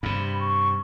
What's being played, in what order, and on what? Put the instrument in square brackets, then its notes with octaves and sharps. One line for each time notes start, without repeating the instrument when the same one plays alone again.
[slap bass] G2 C3 [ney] B5
[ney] C#6